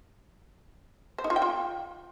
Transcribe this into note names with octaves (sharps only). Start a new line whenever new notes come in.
C5
D#4
F4
G5
F4